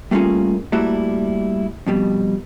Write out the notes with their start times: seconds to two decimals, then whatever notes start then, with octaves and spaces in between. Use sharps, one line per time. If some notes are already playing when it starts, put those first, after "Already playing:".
0.11 G3 A3 A#3 C#4 F4 G#4
0.72 G3 A3 A#3 E4 F#4 E5
1.87 F2 B2 G3